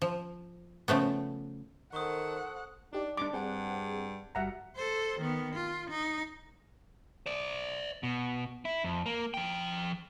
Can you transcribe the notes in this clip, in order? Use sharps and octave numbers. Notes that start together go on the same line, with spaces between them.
F3
C#3 F3 A3 B3
D#3 A4 C5 F#5 C#6 D#6
D4 D#4 G4 D5
G2 D4 D6
G2 C4 G#4 F#5
G1 G3 F#4 E5 F#5 A#5
A4 C5
D#3 B3
F4
D#4
C5 D5
B2
E4
F2
A#3
F3 G5